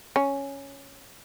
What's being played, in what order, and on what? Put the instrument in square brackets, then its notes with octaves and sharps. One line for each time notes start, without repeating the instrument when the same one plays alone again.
[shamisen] C#4